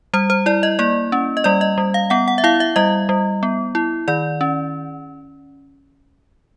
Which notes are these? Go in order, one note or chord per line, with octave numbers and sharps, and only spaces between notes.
G3 C5
C5
E4 D5
D#5
A#3 D5
C#4
D#5
G3 D5
D#5
G3
F5
B3 F#5
F#5
E5
E4 F5
E5
G3 D#5
G3
B3
E4
D#3 D5
C#4